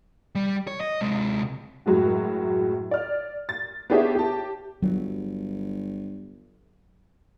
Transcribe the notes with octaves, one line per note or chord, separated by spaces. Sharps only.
G3
C#5
D#5
C3 G#3
F#2 A2 F#3 G#3 F#4
D5 F6
A6
B3 D4 G4 G#4 C#5 E5
G4 A5
G1 F#3